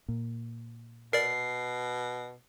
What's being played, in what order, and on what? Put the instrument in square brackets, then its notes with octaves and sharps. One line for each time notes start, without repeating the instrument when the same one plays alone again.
[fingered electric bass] A#2
[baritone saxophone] B2 [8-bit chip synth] A#4 D5 [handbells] C7